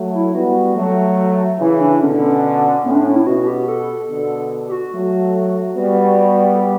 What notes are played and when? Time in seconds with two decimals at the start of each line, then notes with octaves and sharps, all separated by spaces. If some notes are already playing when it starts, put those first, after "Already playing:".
Already playing: F#3 A3
0.14 E4
0.35 G3 B3 F#4
0.76 F#3 A3
1.60 C#3 E3 E4
1.81 D4
2.01 B2 D3 C#4
2.85 A2 B3
2.91 C#4
2.95 D4
3.05 C#4
3.16 E4
3.26 B2 F#4
3.47 G4
3.69 A4
4.09 B2 D3
4.68 G4
4.72 F#4
4.93 F#3 A3 F#4
5.77 G3 B3
6.54 A4
6.60 G4